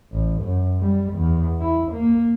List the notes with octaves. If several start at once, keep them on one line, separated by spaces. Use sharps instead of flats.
A1
F#2
G3
E2
E4
A#3